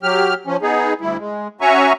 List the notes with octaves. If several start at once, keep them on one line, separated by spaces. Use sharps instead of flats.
F#3 G4 F6
F3 C#4
B3 D#4 G#4
D2 G3 E4
G#3
C#4 F#4 E5 G#5 A#5 C#6